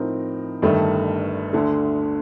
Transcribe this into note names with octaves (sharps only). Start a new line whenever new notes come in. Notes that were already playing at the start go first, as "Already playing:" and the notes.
Already playing: A2 F3 C4 D#4 A#4
G1 G2 D#3 A3
D2 D3 A3